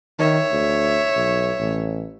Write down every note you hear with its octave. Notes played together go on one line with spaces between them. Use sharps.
D#3 C#5 E5
D2
B1
A1